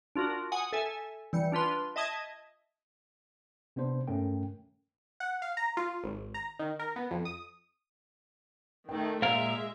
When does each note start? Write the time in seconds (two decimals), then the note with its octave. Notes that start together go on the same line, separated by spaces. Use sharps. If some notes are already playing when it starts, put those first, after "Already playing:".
0.16 D4 F4 F#4 A#4
0.52 F#5 G#5 D#6
0.73 A4 E5 G#5
1.33 E3 G3 C#7
1.52 D4 F4 B4 C6
1.96 D#5 E5 A5 D#6 G#6
3.76 C3 B3 D4 C5
4.08 G2 A3 C#4 A#4 G5
5.20 F#5
5.42 F5
5.57 A#5
5.77 F4
6.04 G#1
6.34 A#5
6.59 D#3
6.79 A#4
6.96 B3
7.11 F2
7.25 D#6
8.89 D#3 A3 G5
9.22 A#2 G#3 A#4 E5 F5